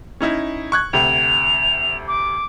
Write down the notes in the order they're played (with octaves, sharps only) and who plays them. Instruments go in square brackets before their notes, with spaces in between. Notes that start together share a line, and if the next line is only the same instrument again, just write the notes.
[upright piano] C#4 D#4 E4
C#6 F#6 G#6
[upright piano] D2 C3 G5 [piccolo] F7
[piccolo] D6